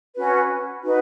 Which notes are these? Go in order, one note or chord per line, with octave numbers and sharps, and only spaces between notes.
C#4 F#4 B4
D#4 F#4 B4